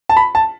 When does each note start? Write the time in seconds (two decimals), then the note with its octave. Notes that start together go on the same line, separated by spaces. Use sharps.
0.09 A5
0.17 B5
0.35 A5